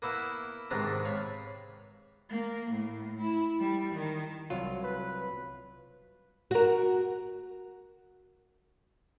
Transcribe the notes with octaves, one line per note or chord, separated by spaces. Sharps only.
A#3 B3 E4 E5 F#5
G#2 C3 D#3 B3 D4 A#5
C#5 F5 B5
A#3
A2
E4
G3
D#3
C2 F#3 F4
B4
F#4 A#4